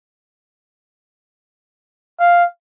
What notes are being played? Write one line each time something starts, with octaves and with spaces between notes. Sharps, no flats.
F5